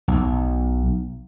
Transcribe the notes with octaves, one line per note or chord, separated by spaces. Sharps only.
B1